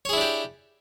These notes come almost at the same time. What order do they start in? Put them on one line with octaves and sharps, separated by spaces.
C#5 G#4 E4 D4 G4